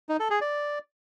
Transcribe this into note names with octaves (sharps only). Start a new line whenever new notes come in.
D#4
A4
G#4
D5